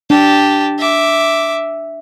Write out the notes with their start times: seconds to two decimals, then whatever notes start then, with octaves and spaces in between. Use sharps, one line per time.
0.10 D4 G4 A5
0.79 E5 D6